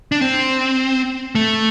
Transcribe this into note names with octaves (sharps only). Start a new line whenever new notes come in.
D4
C4
A3